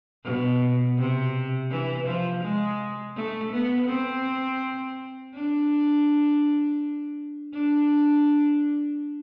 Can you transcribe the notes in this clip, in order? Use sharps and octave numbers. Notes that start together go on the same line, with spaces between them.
B2
C3
E3
F3
G#3
A3
B3
C4
D4
D4